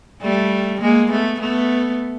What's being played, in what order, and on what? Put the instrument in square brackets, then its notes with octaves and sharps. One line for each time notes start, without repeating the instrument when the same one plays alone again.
[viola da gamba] G3 A3
G#3 A#3
A3 B3
A3 B3